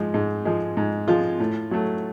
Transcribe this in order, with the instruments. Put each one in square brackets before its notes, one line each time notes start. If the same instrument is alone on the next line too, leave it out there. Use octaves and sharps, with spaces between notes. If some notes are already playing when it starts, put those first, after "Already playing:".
Already playing: [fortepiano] G#2 F3 G#3
G#2
F3 G#3
G#2
F3 G#3 F4
A2
F#3 A3